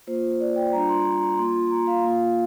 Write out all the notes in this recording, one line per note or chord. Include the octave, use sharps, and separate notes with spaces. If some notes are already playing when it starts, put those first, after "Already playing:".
A#3 F4 C5
D5
G5
G3 D4 F4 A#5
C6
C6
A#5
A#3 F4 C6
A#5
F5
A#3 F4